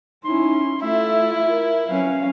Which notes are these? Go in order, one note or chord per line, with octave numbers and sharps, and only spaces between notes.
C#4 D#4 E4 C6
A3 E4 F4 E5
A#4
F#3 C#4 B4 F5